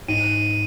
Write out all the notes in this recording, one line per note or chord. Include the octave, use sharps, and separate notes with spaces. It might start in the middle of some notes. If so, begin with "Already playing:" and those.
G#2 D#7